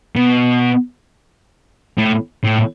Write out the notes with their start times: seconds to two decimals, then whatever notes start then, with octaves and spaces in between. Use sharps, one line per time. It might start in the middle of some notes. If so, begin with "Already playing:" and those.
0.16 B2
1.98 A2
2.43 A2